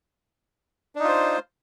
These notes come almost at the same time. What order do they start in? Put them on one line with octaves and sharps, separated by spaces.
D4 D#4 F4 C5